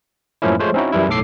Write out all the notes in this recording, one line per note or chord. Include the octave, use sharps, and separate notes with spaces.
F#2 A2 F3 A#3 C#4 E4
F3 G#3 A3 C5 C#5
C4 C#4 D#4 E4 F#4
F#2 E3 G3 E4
B1 A2 A4 D6 C7